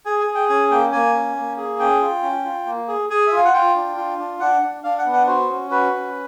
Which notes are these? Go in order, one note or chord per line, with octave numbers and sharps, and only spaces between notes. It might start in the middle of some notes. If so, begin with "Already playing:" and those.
G#4 G#5
G#5
G#4
G5
C#4 G#5
A#3 G5
A#3 G#5
C#4
A#3
G#4
C#4 G5
F4
C#4
F4
A#3
G#4
G#4 G#5
E5
F4 F5
F#5
F4 G5
D4
F4
D4
D4 F#5
D4
D4 F5
F#5
B3
F#5
F#4 C5
C#4
F#4 B4
C#4